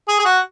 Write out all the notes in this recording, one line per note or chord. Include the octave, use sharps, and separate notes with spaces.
G#4
G#4
F#4